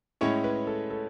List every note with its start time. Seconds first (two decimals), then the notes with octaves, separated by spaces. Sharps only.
0.21 A2 G#3 C#4 E4 C#5
0.44 B4
0.67 A4
0.90 A4